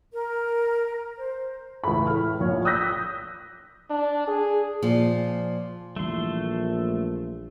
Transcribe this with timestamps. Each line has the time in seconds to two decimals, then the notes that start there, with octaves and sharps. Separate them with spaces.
0.13 A#4
1.17 C5
1.84 C#2 A2 E3 A3 B5
2.07 A2 F6
2.40 A#1 C#5
2.65 D#6 E6 F#6 G6 A#6 B6
3.90 D4
4.28 G#4
4.82 A#2 F3
5.96 A#1 E3 G3 A3 C6